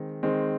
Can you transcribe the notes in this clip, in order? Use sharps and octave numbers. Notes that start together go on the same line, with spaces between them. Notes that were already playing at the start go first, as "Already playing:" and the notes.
Already playing: D#3 G#3 C4
D#3 G#3 C4